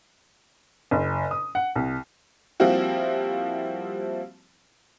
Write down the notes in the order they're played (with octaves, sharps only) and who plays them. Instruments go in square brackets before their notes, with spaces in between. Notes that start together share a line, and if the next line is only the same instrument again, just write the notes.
[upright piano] F#1
D#6
F#5
C2
[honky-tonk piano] F3 G3 A#3 C4 E4 F#4